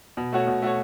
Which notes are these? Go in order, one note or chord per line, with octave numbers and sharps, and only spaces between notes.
B2
A3 F#4 C#5
B2
A3 F#4 C#5